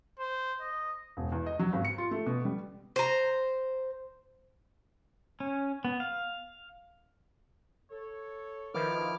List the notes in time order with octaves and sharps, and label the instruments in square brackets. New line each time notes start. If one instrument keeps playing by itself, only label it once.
[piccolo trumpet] C5
D#5
[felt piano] E1
E2
D#5
F#3
G#1
C#7
F4
A3
B2
G3
[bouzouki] C5 A#5
[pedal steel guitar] C#4
B3
F5
[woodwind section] A4 C#5
[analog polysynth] D#3 F3 [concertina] E4 D6 F6 [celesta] A#4 B4